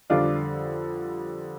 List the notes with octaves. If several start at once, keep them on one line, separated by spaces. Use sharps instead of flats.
F2 D3 G3 D4 F4